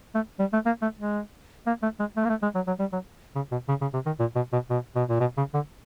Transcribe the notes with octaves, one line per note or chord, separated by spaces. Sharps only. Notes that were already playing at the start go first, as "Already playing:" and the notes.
A3
G3
A3
A#3
A3
G#3
A#3
A3
G#3
A3
A#3
A3
G#3
F#3
F#3
G3
F#3
C#3
B2
C#3
C#3
C3
D#3
A#2
B2
B2
B2
B2
A#2
B2
C#3
D3